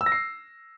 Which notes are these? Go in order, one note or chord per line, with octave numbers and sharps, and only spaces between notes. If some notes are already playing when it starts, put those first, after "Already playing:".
E6
A#6
C7